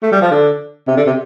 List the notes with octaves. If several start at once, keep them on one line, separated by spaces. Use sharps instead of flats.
A3
G3
F3
D3
C3
D3
C3